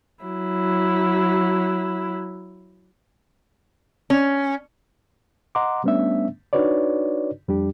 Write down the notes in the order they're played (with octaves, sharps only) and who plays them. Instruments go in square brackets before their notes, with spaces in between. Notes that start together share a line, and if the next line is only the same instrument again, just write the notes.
[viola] F#3 E4
[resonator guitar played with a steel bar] C#4
[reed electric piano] D#5 F#5 A#5 C6 D6
G3 A3 B3 C#4 D4 E5
D4 D#4 F#4 B4 C#5 D5
F2 G3 D4 G4